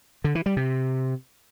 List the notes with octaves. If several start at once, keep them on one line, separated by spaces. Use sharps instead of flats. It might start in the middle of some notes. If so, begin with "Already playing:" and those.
D3
E3
G3
C3